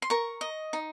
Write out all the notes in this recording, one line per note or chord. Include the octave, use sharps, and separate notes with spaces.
C6
A#4 C#6
D#5
D#4